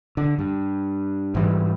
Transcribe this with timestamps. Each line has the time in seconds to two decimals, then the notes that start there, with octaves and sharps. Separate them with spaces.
0.17 D3
0.39 G2
1.35 G#2 E3 G3